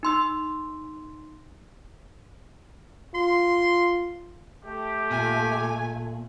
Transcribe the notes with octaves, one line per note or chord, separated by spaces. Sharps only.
D#4 C6 E6
F4 C6
A3 G4
A#2 G#5